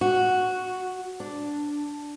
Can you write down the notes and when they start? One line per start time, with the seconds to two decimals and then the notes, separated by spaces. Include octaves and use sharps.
0.01 F#4
1.20 D4